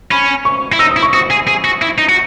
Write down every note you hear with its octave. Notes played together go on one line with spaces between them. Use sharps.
C#4 B5
C#6
E4
D#4 E6
D#6
E4
C#6
F#4 D#6
G#4
G#4
F#4
E4
D#4
F#4